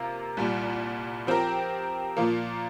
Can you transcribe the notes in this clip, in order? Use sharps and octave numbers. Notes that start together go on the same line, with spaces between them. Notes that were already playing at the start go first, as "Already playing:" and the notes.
Already playing: C3 A#3 F4 A#4
C2 A#2 G3
F3 C4 G4 A#4
A#2 F3 A#3